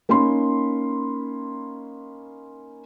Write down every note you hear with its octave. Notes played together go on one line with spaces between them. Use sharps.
A#3 C#4 D#4 B5 C6